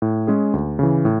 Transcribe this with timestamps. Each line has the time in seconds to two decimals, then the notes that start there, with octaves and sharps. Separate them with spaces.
0.02 A2
0.27 G#3 C#4 G#4
0.53 D2
0.79 C#3 E3
1.05 A2